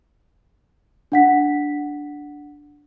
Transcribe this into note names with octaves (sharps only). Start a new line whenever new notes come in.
D4 F#5 B6